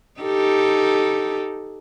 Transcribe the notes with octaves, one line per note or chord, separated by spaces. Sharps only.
D#4 G4 A4